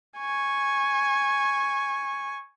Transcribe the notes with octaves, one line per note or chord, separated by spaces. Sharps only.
G#5 C#6